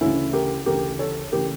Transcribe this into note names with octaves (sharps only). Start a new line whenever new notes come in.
D2 C#3 E3 A3 C#4 E4
G4 A#4
D2 C#3 E3 A3 G4 A#4
A4 C#5
C#3 E3 A3 G4 A#4